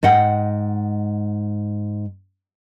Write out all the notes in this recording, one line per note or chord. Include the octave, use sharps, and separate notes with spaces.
G#2 D#5 F#5 G5